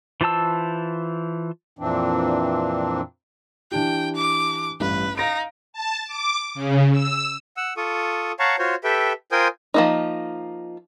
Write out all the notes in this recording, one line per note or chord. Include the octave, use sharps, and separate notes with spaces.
E3 F4 C5 A5 E6
F2 A#2 E3 C4 D4
E3 D4 G4 G5
D6
A1 G2 B4
D#4 F5 A#6 D7
A5
D6
C#3
E6
F#5 E6
F4 A4 C#6 D#6
C#5 F5 F#5 A5 A#5 C#6
F4 F#4 C5 C#5
G4 A4 B4 E5 G5
F4 A#4 C5 G5 G#5 D#6
F3 A#3 D#4